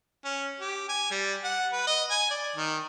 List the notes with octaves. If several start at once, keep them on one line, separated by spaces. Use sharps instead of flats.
C#4
G4
G#5
G3
F#5
B4
D#5
G#5
D5
D#3